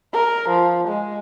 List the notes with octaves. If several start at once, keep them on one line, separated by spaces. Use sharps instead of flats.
A#4
F3
G#3